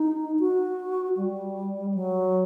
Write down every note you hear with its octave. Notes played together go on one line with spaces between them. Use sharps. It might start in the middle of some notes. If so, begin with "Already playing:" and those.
Already playing: D#4
F#4
G3
F#3